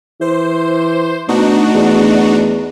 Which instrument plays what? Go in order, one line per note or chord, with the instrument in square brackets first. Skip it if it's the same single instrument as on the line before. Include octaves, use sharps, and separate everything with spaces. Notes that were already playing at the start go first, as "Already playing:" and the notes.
[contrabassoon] E3 [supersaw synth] C5
[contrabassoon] B2 [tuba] A3 [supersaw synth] D4 D#4 F#4
[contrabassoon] E2